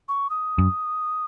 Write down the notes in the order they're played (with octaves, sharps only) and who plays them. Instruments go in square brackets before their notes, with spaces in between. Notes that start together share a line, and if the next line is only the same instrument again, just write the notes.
[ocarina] C#6
D#6
[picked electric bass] F#2